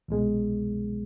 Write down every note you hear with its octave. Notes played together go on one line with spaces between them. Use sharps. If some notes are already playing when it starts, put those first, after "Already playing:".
C2 B2 G#3